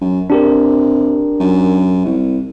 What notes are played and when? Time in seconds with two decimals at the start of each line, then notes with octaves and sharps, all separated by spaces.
0.01 F#2
0.30 C3 D4 G4 A#4
1.40 F#2
2.05 C2